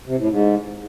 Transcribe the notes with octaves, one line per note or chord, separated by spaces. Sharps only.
C3
A2
G#2